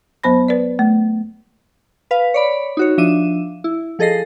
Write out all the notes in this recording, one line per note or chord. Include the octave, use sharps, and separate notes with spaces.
E2 F#3 B3 C5 B5 A#6
B4 D5
A3
B4 F5
C#5 D5 B5
D#4 F#4 C#5
F3 D4 E5 D#7
E4
F3 G#4 A4 D#5 A#6 C7